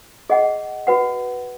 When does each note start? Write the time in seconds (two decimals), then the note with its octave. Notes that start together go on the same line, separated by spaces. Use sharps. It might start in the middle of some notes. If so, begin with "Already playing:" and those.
0.30 G#4 D#5 F#5
0.87 F#4 B4 F#5